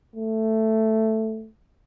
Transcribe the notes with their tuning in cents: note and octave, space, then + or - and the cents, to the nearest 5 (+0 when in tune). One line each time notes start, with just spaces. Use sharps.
A3 +5